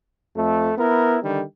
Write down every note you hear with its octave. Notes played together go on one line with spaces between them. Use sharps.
F2 A3
B3 E4 A#4
D3 D#3 G3